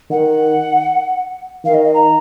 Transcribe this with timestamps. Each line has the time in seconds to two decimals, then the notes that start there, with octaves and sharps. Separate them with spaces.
0.10 D#3 F#5
1.65 D#3 F5
1.74 D#5
1.85 D#5
1.94 A#5